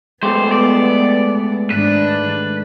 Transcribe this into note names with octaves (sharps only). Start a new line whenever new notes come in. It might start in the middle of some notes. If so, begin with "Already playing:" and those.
G#3 A3 B3 G4 C5
D5
G#2 D#3 D4 B4